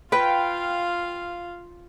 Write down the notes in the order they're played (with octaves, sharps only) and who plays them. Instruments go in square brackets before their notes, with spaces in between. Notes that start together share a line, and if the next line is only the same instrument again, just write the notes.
[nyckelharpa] F4 F5 [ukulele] B4 [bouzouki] G5